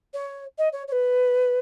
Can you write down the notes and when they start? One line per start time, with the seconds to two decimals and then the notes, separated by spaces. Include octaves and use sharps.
0.13 C#5
0.58 D#5
0.72 C#5
0.87 C#5
0.91 B4